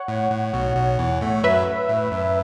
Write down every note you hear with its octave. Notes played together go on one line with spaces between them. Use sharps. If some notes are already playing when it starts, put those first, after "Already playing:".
Already playing: C#5 F#5
A2
A2
B1 B2
B1 B2
E2 E3
A2 A3
F#2 F#3 B4 E5
A2
F#2